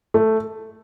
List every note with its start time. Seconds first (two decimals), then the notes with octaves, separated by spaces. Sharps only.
0.14 A3